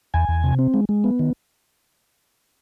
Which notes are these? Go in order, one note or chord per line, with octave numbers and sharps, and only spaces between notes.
E2 G#5
E2
C3
C4
G#3
G#3
B3
D#3